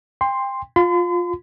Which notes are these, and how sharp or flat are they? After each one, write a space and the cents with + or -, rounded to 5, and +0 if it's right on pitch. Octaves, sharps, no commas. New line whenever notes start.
G5 +30 C6 +0
F4 +15 C6 -45